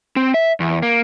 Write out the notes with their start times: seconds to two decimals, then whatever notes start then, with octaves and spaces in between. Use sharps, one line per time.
0.16 C4
0.34 E5
0.60 E2
0.83 A#3